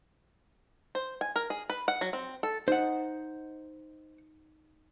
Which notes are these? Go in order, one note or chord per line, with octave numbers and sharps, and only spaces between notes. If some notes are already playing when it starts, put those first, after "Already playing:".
C5
G#5
A#4
G#4
B4
F#5
F#3
C4
A4
D#4 C5 F#5